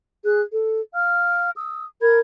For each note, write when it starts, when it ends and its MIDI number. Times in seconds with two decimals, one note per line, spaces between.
0.25 0.41 68
0.25 0.41 90
0.52 0.81 69
0.95 1.51 77
0.95 1.51 89
1.56 1.85 87
1.56 1.85 88
2.02 2.18 70
2.02 2.18 83
2.02 2.18 92